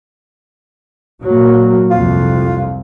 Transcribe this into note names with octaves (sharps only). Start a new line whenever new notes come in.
A#2 F#3 A#3
C2 F2 F4